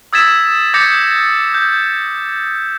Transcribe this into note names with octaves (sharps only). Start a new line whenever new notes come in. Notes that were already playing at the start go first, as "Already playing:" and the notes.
D#6 E6 G#6 A6 B6 E7
D6 D#6 G6 A6 A#6 C#7
G6